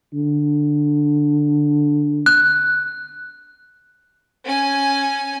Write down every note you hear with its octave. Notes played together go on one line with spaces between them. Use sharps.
D3
F#6
C#4 G#5